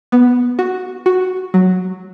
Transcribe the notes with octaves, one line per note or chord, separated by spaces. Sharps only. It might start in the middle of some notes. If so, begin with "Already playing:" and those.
B3
F#4
F#4
F#3